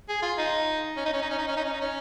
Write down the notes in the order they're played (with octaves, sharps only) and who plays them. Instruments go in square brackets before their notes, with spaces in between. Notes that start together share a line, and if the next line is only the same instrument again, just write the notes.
[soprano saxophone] G#4
F4
D#4
C#4
D#4
C#4
D#4
C#4
D#4
C#4
D#4
C#4
D#4
C#4